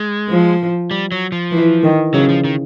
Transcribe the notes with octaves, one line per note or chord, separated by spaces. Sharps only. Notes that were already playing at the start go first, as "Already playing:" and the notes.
Already playing: G#3
F3
G3
F#3
F3
E3
D#3
C#3 F#3
F3
D#3